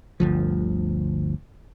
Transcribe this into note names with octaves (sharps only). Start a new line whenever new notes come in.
G1 D2 F3